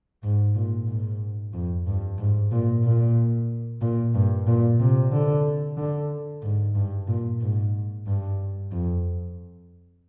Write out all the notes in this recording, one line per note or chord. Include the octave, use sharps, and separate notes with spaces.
G#2
A#2
G#2
F2
G2
G#2
A#2
A#2
A#2
G2
A#2
C3
D3
D3
G#2
G2
A#2
G#2
G2
F2